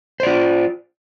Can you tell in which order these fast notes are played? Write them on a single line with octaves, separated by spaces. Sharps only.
C5 D5 F4